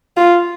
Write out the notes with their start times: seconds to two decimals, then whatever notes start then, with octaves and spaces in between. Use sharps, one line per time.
0.17 F4